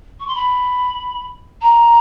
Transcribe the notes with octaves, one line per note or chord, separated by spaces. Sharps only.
C#6
C6
B5
A#5